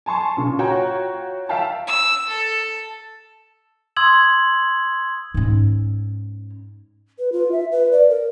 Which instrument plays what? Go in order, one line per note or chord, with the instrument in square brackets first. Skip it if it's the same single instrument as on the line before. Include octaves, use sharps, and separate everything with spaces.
[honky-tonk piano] G#5 A5 C6 C#6
A#2 C#3
F4 F#4 C#5 F#5 G5 A#5
E5 F5 G5 A5
[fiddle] E6
A4
[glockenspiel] C6 D#6 E6 G#6 F#7
[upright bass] G#2 C#4
[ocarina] B4
F4
E5
B4
D5
A#4